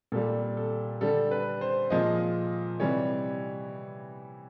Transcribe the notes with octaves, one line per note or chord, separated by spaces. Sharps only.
A#2 G3 A4
A4
D3 G3 A4
B4
C5
A#2 F3 G#3 D#5
C3 E3 G3 C#5